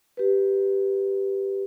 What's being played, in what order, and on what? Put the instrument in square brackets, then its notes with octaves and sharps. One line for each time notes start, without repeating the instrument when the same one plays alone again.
[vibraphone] G4 B4